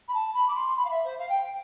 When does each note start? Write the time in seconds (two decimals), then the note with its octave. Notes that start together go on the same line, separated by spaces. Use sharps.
0.08 B5
0.14 A5
0.34 B5
0.48 D6
0.55 C6
0.77 B5
0.85 F5
0.90 E5
1.05 C5
1.19 F5
1.29 G5